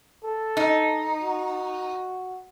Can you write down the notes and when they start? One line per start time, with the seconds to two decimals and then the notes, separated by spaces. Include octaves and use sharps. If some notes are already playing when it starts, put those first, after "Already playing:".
0.23 A4
0.57 D#4
1.22 F#4